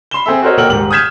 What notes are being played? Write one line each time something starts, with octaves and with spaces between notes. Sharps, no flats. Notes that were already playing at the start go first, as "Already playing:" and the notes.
B5 C6 E7 G7
C4 G#4 A4 E5
F#4 A4 A#4 C5 C#5 D#5
A#2 A4 A#4 F#5 G5 F#7
D#1 G#2 F#7
D#6 F6 G6 G#6 B6 E7